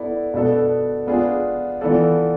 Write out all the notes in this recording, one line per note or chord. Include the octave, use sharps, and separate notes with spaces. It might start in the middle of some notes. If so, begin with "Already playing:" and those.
Already playing: B3 E4 A4 D5
B2 B3 D4 A4
B3 D4 F4 G#4
E3 B3 F4 A4 D5